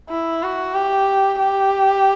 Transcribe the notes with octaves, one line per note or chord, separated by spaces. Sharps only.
E4
F#4
G4
G4